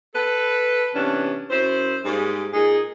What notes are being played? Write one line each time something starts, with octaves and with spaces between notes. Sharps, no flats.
A4 B4
C3 E3 B3 C#4 D4
F#2 E4 C5
G#2 G3 G#3 A#3 G#4
A#2 D#4 G#4